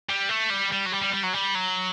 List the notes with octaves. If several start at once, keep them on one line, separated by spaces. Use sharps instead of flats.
G3
A3
G3
G3
F#3
G3
G3
G3
F#3
G3
F#3